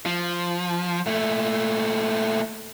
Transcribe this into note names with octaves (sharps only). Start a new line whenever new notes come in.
F3
A#2 A3